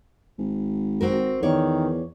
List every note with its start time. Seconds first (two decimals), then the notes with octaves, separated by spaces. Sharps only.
0.39 G#1
1.01 C4 F#4 A#4
1.43 E2 D#3 C#5 D5